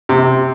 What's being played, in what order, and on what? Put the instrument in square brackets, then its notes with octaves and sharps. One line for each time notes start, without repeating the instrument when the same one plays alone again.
[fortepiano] C3